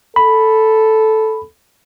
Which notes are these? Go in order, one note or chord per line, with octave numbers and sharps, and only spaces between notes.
A4 B5